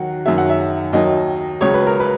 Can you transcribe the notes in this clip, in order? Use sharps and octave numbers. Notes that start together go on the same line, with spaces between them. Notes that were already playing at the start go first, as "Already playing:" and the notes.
Already playing: D#2 D#3 F#3 F#5
F#2 D#3 F#3 E5
F#5
E5
D#2 D#3 F#3 D#5
C#2 C#3 F#3 C#5
B4
A#4
B4